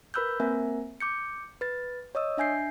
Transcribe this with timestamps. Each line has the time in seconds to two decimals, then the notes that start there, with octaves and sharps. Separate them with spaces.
0.14 A#4 B4 B5 E6 F#6 G6
0.40 A#3 C4 A#4 E5 G#5
1.00 D6 G6 C#7
1.61 B4 A6
2.15 C#5 D#5 D#6 E6
2.37 D4 E5 G#5 G6 C7